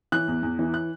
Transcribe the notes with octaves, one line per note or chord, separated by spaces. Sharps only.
E3 F#6
E2
E2
E3
F#6